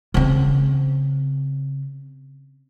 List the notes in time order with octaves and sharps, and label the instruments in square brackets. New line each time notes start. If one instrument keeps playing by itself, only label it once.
[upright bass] C#3 C4